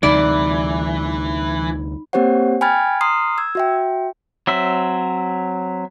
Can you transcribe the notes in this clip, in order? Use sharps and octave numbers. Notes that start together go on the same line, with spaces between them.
D2 C3 E3 G3 D#4 D5 B5
A#3 C4 G4 C5 C#5 F#5
G5 G#5 B5 F6 G#6 A6
A#5 C6 D#6 F6 C7
E6 G#6
F#4 E5 G5
F#3 C4 E5